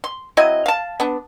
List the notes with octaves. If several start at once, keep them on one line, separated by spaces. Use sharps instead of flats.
C6
F#3 C4 E4 D#5
F5 A5
B3 D4